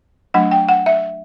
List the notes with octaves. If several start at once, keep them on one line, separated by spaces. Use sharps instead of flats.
F#3 A3 D4 F#5
G5
F#5
E5